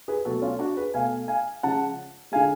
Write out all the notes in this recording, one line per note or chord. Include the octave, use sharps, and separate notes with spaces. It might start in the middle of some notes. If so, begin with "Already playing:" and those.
G#4 B4
B2 F#3 A3 F#4 A4
C#4 F4
D4 F#4
G#4 B4
B2 A3 F5 G#5
F5 G#5
C#3 F3 G#3 F#5 A5
D3 G#3 F5 G#5